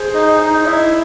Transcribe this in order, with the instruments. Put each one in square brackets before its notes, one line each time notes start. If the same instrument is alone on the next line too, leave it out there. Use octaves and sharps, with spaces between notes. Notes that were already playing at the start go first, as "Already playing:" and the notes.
Already playing: [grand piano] G#4 C5
[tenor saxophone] D#4
D#4
E4